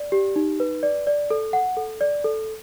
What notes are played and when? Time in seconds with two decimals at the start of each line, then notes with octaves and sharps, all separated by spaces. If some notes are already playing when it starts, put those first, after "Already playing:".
Already playing: D5
0.12 G4
0.36 D#4
0.60 B4
0.83 D5
1.07 D5
1.30 A4
1.53 F#5
1.77 A4
2.01 D5
2.24 A4